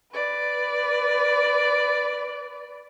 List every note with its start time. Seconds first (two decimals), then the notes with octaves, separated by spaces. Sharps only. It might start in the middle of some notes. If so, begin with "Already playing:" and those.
0.13 B4 D5